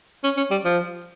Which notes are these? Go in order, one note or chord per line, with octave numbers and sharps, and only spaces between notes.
C#4
C#4
G3
F3